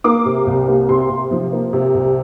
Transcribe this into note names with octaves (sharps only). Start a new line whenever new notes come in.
A#3 D6
C3
C2
A#3
C3 C6
C3
F3
A#3
C3
C2